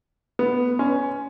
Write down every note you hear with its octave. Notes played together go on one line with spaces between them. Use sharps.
B3
C#4